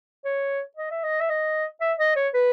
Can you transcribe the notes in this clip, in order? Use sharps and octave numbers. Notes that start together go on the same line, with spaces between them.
C#5
D#5
E5
D#5
E5
D#5
E5
D#5
C#5
B4